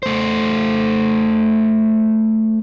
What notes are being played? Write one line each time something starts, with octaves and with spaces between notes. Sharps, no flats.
A3 C5